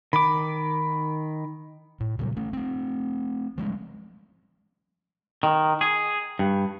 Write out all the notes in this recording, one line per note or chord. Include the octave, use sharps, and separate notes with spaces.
D#3 B5 D6
A2
A#2 C#3 F#3 G3
A3 C#4
A3 C4
F3 G3 G#3 C#4
D#3
G#4
G2